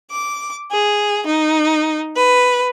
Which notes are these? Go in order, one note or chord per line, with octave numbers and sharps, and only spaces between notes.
D6
G#4
D#4
B4